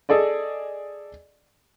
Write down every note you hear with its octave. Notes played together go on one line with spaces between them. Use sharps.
G#4 A4 D5 D#5